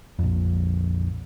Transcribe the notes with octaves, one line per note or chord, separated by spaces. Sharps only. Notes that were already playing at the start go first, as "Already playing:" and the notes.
A#1 F2